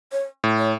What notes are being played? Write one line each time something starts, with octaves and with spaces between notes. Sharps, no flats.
C#5
A2
C#5